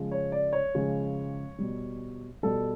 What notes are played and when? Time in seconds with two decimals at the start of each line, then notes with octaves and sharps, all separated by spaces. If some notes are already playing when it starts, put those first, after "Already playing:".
Already playing: C#3 F3 G#3
0.11 C#5
0.32 D5
0.53 C#5
0.75 C#3 F3 G#3
1.59 B2 G3
2.43 B2 G3 A4